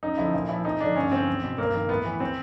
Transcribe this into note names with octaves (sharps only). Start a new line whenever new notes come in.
F#2 D#4
D3 F3 E4
A#2 E4
F3 E4
F2 D#4
D3 F3 D4
G2 C#4
D3 F3 C4
E2
B2
G2 A#3
D#3
A2 B3
E3
C4